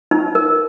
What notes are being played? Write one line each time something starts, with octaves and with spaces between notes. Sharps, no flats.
D#4
A#4